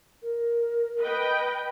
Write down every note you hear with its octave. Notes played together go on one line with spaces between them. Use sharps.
A#4
B4 D#5 G5